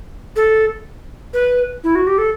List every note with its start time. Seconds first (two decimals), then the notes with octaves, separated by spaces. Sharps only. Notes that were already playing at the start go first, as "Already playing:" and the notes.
0.36 A4
1.33 B4
1.84 E4
1.95 F#4
2.07 G4
2.18 A4